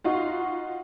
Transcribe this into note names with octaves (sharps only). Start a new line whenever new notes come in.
D#4 F4 F#4